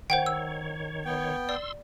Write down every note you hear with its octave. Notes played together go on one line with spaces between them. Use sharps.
D#3 C5 C#5 F#5 G5
E6
B3 G5
D5 C6 E6